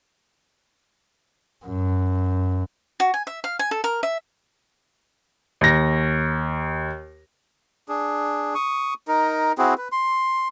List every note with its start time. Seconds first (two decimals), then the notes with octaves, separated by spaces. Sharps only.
1.65 F#2
3.00 F#4
3.14 G#5
3.27 E5
3.44 F5
3.59 G#5
3.71 A4
3.84 A#4
4.03 E5
5.61 D#2 A#6
7.88 D4 G#4
8.55 C#6 D#6
9.08 D#4 A#4
9.58 C4 E4 F#4 G#4
9.78 B4
9.92 C6